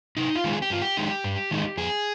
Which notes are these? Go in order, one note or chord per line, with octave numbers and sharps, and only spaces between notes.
C3 D#4
F4
D#3 G#3 C4
G#4
G4
G2 F4
G4
D#3 G#3 D#4
G2
D#3 G#3 D#4
F2 G#4